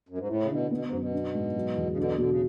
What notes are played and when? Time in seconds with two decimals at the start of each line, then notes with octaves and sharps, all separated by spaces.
0.09 F#2
0.18 G#2
0.28 A2 E4
0.42 C#3
0.49 B2 D3
0.71 B2 B3
0.85 G#2
0.92 F#2
0.99 B2
1.13 D4
1.34 G#2
1.55 F#3
1.76 E2
1.92 C#3
1.97 B2 D3 D4
2.18 B2 D3
2.30 C#3